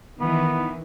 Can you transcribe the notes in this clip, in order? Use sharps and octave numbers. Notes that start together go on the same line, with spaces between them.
D#3 E3 B3